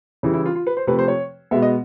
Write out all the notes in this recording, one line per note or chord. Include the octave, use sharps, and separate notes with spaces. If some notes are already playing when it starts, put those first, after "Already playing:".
C#3 E3 G3 E4
E4
F4
F4
B4
C5
C3 F3 A3 B4
C5
C#5
B2 G#3 B3 E5
D#5